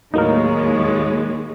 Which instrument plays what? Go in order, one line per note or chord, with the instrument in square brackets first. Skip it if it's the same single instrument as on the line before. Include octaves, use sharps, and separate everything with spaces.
[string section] D#2 G#3 [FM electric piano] A2 F#3 A#3 [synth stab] D#4 A#4 [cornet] C#5